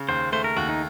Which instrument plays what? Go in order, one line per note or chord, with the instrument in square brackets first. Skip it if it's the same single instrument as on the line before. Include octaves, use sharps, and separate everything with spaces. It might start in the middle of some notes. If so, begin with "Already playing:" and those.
Already playing: [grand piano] C#3
[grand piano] D#2 [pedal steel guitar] C5
[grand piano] A3 [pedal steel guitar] C5
[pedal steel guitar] A#4
[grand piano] D#2 [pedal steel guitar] F#4
[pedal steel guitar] D#4